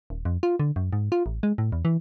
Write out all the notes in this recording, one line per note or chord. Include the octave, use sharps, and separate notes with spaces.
D#1
F2
F4
D3
F#2
G#2
F4
A1
G#3
A2
E2
E3